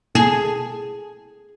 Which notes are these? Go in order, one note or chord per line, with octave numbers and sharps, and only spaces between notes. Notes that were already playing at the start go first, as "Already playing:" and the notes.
G#4